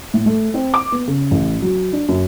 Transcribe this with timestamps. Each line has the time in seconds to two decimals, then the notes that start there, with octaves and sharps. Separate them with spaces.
0.14 A2
0.26 A3
0.54 C4
0.74 D6
0.92 B3
1.07 C#3
1.31 A1
1.62 F#3
1.93 D4
2.09 F#2